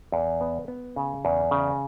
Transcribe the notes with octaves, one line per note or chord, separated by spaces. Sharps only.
E2
B3
B3
C#3
E2
C#3